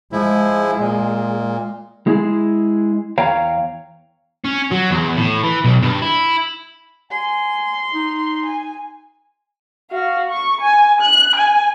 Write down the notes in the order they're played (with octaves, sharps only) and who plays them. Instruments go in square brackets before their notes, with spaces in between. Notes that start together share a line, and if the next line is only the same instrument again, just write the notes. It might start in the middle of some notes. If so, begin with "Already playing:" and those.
[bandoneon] F3 E4 [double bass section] G#3
[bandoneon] A#2
[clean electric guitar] G#3 E4 G#4
E2 C#5 F5 G5 A#5
[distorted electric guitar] C#4
F#3
E2
A2
E3
B1
G2
E4
[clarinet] G#5 [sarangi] C6
[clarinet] D#4
[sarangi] G#5
[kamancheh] F#4 F5
C#6
G#5
F#6
G#5